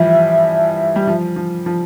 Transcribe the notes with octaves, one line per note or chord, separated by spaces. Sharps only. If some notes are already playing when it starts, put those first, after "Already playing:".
Already playing: E3 F3 G3 E5
G3
F3
F3
F3